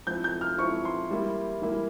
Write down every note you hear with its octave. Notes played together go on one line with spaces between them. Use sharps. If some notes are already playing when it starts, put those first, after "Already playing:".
F3 C4 E4 G6
G6
F6
F3 C4 E4 C#6
C6
E3 G3 A#3 E4
E3 G3 A#3 E4